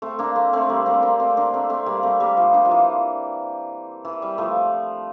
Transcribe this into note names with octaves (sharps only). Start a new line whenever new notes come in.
A3 C4
A#3 D4
A3 C4
A3 C4
G3 A#3
A3 C4
A#3 D4
A3 C4
A#3 D4
A3 C4
A3 C4
G3 A#3
A3 C4
G3 A#3
F3 A3
A#3 D4
F3
E3
E3
G3
F3 A3